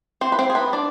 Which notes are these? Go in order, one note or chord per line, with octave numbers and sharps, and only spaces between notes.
C4 C5
B4
C4 C5
G#4
B3 B4
D4 D5